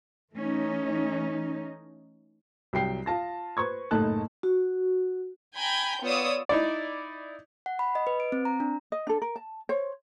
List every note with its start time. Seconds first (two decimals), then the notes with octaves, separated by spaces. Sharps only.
0.34 E3 A3 C#4 D#4
2.73 C2 F#3 G5 C7
3.06 F4 A5 A#6
3.57 B4 C5 C#6 G#6
3.91 F#1 A2 A3 D#4 A5 F#6
4.43 F#4
5.56 G5 G#5 A#5 B5 G6
6.03 B3 F4 C#5 D5 D#6 E6
6.49 D#4 E4 D5
7.66 F#5
7.79 B5
7.95 D#5
8.07 B4
8.20 D7
8.32 C4
8.45 A#5
8.60 D4
8.92 D#5
9.07 D4 A4
9.22 A#4
9.36 A5
9.69 C5 C#5